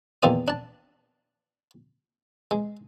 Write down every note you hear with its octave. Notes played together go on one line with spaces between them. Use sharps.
E2 A#2 D#3 F4 D5 D#6
D4 A5
G#3